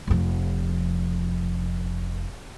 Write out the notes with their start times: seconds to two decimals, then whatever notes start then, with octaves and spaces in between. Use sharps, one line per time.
0.07 F1 F3